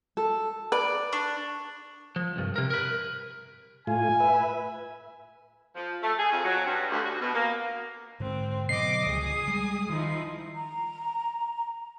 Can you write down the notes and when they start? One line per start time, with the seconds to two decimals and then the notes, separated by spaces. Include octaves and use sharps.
0.17 A4
0.72 B4 D5
1.12 D4 C#6
2.16 F3
2.36 C2 G2
2.56 C3 A#4
2.70 A#4 B4
3.87 A2 F4 G#5
4.20 B4 E5
5.76 F3
6.02 A3
6.18 G#4
6.32 F2
6.44 F#3
6.66 G2
6.91 D2
7.04 F#4
7.20 B2
7.34 A#3
8.20 G#2 D3 C4
8.69 B2 D3 F#3 D#5 D6 C7
9.06 C#2 D3 F3 G#4 D#6
9.48 G3 G#3
9.90 D#3 F3 D#4 E4
10.55 A#5